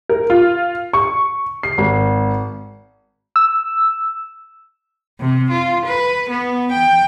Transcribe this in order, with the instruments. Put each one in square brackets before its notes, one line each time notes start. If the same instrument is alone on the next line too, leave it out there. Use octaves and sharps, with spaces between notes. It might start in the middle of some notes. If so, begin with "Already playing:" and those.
[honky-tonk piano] A#4
F4
C#6
C7
G#1
[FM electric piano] E6
[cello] C3
F4
B4
B3
G5